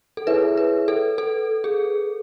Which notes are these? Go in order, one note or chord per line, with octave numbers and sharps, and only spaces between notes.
A4
E4 G#4 B4 C#5 E5
B4
A4
A4
G#4